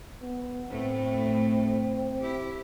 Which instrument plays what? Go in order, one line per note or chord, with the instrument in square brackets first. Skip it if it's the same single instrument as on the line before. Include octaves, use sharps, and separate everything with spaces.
[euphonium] B3
[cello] A2 A3 [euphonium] C4
[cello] E4 G4